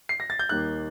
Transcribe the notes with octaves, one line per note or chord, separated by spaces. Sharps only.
C7
A#6
A6
G6
D#2 D#3 G3 A#3 D#4 F#6